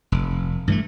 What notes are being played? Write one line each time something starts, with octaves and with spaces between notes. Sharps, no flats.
F1
G2 E3 G#3 A3